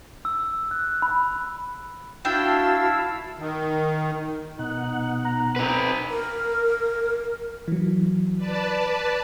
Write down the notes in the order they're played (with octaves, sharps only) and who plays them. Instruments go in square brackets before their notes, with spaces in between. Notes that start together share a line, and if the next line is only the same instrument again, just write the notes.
[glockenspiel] E6
F#6
B5
[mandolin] D4 G5 [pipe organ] E4 F5 A5 [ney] F#4 [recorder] E6
[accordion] D#3
[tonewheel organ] B2 F#5 [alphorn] D#4
[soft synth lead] A#5
[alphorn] C4 [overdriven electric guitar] D#4 B4
[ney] A#4
[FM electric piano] E3 F#3
[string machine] B4 D5 A5